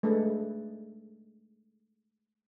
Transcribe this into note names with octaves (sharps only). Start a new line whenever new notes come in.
G#3 A3 D4 A4 B4